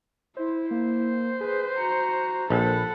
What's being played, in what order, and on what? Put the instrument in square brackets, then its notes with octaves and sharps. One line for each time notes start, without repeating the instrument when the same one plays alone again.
[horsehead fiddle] E4 [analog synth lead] C5
[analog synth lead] A#3 [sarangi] C5
[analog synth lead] G#4 [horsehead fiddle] B4
[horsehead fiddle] F#4 A#5 [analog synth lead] C#7
[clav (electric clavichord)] A#1 [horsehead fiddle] A4 F#5 [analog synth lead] B5